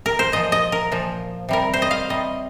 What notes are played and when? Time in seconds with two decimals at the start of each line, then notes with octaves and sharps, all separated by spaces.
0.06 A#4
0.19 C5
0.32 A#2 F3 D#5
0.52 D#5
0.72 A#4
0.92 A#2 F3
1.49 C3 G3 A#4
1.73 C5
1.82 D#5
1.91 F5
2.09 C3 G3 D#5